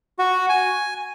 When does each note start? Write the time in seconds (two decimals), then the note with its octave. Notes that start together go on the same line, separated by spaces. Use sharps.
0.19 F#4
0.49 G#5